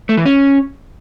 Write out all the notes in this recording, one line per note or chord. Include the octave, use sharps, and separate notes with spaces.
A3
E3
C#4